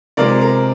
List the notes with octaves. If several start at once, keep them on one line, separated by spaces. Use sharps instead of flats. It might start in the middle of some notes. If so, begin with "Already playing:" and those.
C3 F3 G#3 A#4 D5
A#4